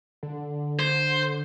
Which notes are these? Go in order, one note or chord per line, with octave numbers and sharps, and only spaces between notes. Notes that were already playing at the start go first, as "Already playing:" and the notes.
D3
C5